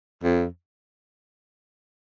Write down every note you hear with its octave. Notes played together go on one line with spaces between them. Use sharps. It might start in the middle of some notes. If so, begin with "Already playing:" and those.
F2